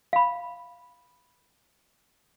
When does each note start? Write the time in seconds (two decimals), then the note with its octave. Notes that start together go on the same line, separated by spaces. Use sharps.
0.13 F5 B5